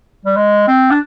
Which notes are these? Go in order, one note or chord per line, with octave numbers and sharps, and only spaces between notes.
G3
G#3
C4
D4